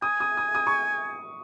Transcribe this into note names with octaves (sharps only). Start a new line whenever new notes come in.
G#5 D#6
D#6
D#6
D#6
C#6